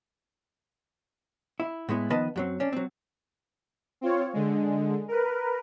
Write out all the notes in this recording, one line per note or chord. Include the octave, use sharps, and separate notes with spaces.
E4
A2 G#3 B3 E4
D#3 F3 B3 B4 D#5 A5
F#2 F#3 C4
C#4 D4
F#3 C4
C4 F4 C#5
D3 G#3
A#4 B4